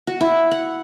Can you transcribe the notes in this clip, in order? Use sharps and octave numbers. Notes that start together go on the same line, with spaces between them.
F#4
E4
F#5